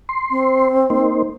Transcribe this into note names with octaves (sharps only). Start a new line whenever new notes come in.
C6
C4
A#3 D#4 C5